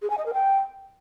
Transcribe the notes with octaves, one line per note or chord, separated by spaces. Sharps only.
G#4
G#5
D#5
A#4
G5